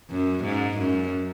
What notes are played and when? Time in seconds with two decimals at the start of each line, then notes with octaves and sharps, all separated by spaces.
0.10 F#2
0.44 G#2
0.78 F#2